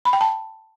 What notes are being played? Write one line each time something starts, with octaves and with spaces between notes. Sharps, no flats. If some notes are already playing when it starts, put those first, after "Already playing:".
B5
G5
A5